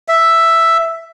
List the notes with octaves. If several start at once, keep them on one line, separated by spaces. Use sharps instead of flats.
E5